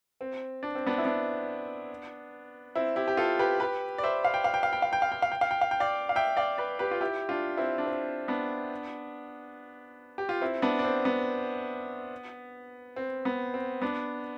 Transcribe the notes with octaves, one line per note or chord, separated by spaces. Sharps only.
C4
D4
C4
B3 D4
E4
B3 D4
C4 E4
E4 G4
G4
F4 A4
G4 B4
G4 B4
D5
C5 E5
F5
G5
F5
G5
F5
G5
F5
G5
F5
G5
F5
G5
F5
G5
F5
G5
D5 F5
F5
E5 G5
D5 F5
B4 D5
G4 B4
F4
E4 G4
D4 F4
C4 E4
D4
C4
B3 D4
G4
F4
C4 E4
B3 D4
D4
C4
B3
C4
B3
C4
B3 D4